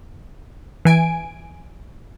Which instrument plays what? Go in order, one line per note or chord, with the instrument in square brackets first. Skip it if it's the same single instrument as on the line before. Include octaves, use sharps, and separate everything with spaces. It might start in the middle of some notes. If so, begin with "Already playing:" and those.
[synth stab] E3 G#5 D7